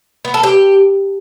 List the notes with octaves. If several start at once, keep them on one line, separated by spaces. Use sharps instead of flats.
B3
A4
G4